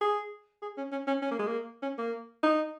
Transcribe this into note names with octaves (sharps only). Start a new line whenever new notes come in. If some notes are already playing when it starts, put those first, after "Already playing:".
G#4
G#4
C#4
C#4
C#4
C#4
A#3
G#3
A#3
C#4
A#3
D#4